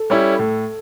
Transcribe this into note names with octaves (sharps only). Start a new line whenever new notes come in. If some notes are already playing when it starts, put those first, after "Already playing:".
Already playing: A4
G3 C#4 E4
A2